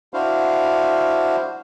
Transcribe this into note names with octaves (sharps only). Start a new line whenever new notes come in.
D4 E4 F#4 C5 F5